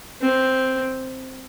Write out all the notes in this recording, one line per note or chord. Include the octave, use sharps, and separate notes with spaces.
C4